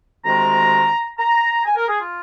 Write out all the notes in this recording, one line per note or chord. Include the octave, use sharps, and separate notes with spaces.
D2 C3 D#3 G#3 C4 A#5
A#5
G#5
A#4
G#4
F4